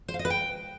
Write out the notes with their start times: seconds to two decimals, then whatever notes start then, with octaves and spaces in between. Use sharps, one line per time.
0.08 C5
0.14 F5
0.19 D#5
0.25 B4
0.30 G5